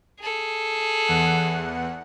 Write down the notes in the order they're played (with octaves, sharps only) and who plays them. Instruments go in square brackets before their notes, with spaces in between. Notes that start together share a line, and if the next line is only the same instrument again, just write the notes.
[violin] G#4 A4
[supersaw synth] E2 F#5